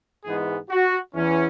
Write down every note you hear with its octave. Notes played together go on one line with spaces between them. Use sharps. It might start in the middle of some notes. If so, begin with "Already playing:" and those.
G#2 E3 G#3 B3 G#4
F#4
E2 E3 C#4